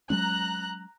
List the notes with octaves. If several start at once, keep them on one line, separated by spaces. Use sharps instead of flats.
F#3 G#3 C#4 A#5 F#6